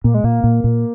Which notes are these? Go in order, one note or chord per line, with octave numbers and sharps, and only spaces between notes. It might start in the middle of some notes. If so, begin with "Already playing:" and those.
A#2 A#3
G#3
A#2 A#3
A#2
A#2